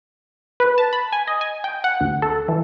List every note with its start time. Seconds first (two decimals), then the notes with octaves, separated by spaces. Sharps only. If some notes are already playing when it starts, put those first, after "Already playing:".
0.60 B4
0.78 A5
0.93 B5
1.13 G#5
1.27 D#5
1.41 G#5
1.64 G5
1.84 F#5
2.01 D2
2.22 A4
2.48 E3